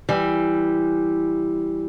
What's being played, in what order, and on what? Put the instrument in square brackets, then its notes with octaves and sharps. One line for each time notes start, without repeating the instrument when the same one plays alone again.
[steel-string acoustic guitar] E3 G3